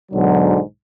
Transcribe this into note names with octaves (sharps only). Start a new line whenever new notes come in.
B1 G#2 D3 F#3